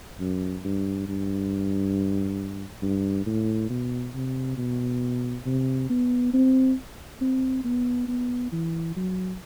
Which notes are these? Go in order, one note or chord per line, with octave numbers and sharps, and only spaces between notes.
F#2
G2
G2
G2
A2
B2
C3
B2
C3
B3
C4
C4
B3
B3
E3
F#3